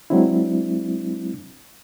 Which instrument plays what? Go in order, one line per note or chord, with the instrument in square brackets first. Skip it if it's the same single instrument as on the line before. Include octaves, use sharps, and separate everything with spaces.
[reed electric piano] F#3 G#3 C4 D4 E4